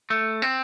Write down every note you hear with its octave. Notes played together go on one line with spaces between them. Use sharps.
A3
C4